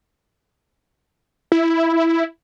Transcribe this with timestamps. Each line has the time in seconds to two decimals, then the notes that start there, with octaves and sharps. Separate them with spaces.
1.52 E4